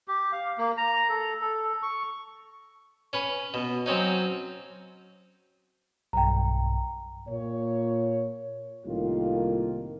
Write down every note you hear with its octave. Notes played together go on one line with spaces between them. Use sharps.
G4
F5
A#3
A#5
A4
A4
C#6
C#4 B4
B2
F#3 C4 C#4 D#4
B1 G2 G5 A#5
A#2 C#5
C2 A2 D#3 A#3 F4